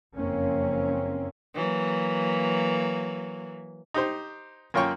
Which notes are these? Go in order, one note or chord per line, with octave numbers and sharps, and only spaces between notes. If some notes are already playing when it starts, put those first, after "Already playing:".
F#1 F2 A#3 C4 C#4
E3 F#3 A#3
D#4 G4 C5
F#2 A#3 F4 C#5 G5 C#6